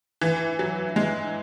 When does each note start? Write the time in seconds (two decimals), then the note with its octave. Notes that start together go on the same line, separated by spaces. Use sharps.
0.21 E3
0.59 F#3
0.96 G#3